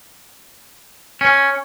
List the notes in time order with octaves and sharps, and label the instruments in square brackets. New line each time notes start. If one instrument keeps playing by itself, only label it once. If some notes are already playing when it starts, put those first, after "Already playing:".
[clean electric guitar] C#4